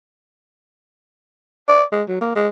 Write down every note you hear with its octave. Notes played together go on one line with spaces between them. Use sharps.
D5
G#3
F#3
A#3
G#3